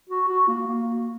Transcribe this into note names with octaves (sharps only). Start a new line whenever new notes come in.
F#4
F#4
A#3
A#3